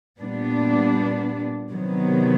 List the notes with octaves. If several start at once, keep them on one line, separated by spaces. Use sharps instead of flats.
A#2 G3 B3 D4
C3 D#3 F#3 B3